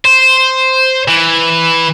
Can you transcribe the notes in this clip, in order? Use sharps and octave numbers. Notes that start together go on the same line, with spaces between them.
C5
E3